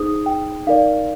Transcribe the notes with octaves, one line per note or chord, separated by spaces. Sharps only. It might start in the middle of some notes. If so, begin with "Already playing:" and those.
Already playing: D#4 G#4 C5 D#6
G5
D#4 A#4 D5 F5